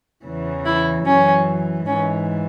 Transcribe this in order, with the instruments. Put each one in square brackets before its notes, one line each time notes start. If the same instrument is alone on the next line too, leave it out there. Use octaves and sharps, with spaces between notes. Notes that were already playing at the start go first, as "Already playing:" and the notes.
[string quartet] E2 C#3 E3
E4
F#2 E3 C#4
G#2 E3 C#4